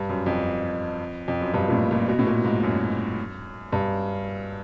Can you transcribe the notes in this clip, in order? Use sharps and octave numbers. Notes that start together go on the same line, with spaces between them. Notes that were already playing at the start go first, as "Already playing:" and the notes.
Already playing: G2
F#2
F2
F2
F#2
G2
A#2
A2
A#2
B2
A2
A#2
G#2
F#2
G2